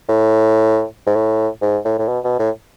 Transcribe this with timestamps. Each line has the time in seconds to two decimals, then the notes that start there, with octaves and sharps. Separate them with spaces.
0.08 A2
1.07 G#2
1.16 A2
1.62 G#2
1.85 A2
1.99 A2
2.08 B2
2.24 B2
2.39 A2